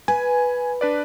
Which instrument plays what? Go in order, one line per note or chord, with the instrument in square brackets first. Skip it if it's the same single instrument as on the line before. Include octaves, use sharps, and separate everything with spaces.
[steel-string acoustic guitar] B4 [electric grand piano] G#5
[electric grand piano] D4 B4 D5